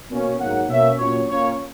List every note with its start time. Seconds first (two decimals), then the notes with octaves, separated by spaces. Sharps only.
0.10 B2 A#3 C#4
0.39 G#2 F#3 A#3 F#5
0.69 B2 A#3 C#4 E5
0.98 A#2 F#3 C#4 C#5
1.29 A#2 A#3 C#4 C#5